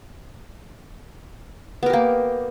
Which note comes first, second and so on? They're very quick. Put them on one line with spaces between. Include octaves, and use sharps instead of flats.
B3 A#4 G4 A#3